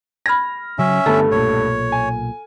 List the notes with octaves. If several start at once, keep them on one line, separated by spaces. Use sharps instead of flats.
B5 F6 G#6 A#6
C#3 F#3 C#4 E5
G2 D3 A3 B3 A4
B1 A#2 C#5
G#5